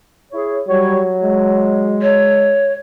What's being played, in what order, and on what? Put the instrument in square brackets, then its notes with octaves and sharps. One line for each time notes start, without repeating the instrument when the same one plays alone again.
[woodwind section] E4 G#4 C#5
[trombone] F#3 [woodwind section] G3 C#5
[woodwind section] G#3
[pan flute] C#5